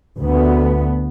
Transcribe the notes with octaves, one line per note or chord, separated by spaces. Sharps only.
D2 B3